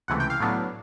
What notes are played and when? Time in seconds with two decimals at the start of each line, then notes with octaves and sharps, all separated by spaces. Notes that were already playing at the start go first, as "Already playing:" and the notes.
0.08 C#2 C3 E3 A3 F#5
0.20 G5
0.30 F5
0.40 A2 F#3 B3 D4